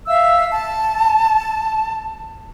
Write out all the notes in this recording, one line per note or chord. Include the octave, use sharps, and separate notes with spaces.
E5 F5 E6
A5